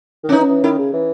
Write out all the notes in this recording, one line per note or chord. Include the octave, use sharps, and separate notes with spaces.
D#3
C#4
E3 D#4
E3
D#3 E4
C#3
E3